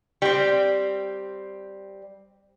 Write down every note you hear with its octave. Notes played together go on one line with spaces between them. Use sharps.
G3 C4